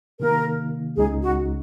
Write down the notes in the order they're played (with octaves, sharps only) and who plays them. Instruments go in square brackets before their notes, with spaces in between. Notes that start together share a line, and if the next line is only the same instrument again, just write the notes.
[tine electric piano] C3 D#3 A#3 D#4 [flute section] A#4
[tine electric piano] C#2 C#3 G#3 D#4 [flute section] G#4
[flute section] F#4